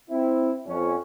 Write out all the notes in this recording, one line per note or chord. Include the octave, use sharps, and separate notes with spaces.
C4 E4
F2 C#4